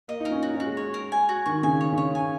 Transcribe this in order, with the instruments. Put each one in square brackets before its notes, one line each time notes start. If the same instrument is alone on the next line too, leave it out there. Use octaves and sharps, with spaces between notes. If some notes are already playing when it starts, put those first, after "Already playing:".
[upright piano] A#3 [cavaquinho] D#5
[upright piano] D#4
[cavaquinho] A#4
[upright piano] C#4
[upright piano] D#4 [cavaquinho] F#4
[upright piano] C#4
[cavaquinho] F#4
[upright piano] G#3
[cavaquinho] C#5
A#4
G#5
F#4
[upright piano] D#3 [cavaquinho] C#6
[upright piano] C#3 [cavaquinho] G#5
[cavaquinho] C#5
[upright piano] C#3
[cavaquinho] C#5
G#5